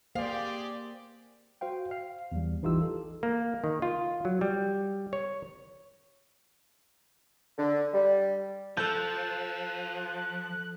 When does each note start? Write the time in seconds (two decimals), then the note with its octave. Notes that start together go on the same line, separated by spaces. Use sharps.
0.15 A#3 G4 G#4 C5 D5 F5
1.61 F#4 C5 F5 G5
1.91 F5
2.32 E2 G3
2.62 A1 E3 D#4 F4 G4 E6
2.82 A4
3.23 A#3
3.64 D#3
3.82 F4
4.25 F#3
4.41 G3
5.13 C#5
7.58 D3
7.93 G3
8.77 F3 A4 A5 F#6 G6